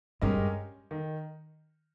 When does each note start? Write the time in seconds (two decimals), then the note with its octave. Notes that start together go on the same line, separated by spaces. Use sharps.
0.22 G2 G#3 C#4 G4 A#4 D#5
0.91 D#3